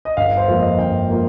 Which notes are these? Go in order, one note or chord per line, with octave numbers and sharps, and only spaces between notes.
D#5
G1 F5
C5
F2 F3 A#3
D#5
G1 G5
F3 A#3